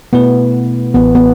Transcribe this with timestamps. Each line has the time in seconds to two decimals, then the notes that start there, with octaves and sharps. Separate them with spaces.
0.13 B2 A3 B3 E4 B4
0.94 A1 A2 E3 B3
1.15 B3